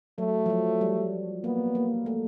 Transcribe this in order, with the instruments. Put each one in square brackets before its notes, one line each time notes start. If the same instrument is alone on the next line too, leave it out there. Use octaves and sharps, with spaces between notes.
[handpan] F#3 [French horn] A3
[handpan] F3
F#3
G3
[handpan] A#3 [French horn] B3
[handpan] A#3
A3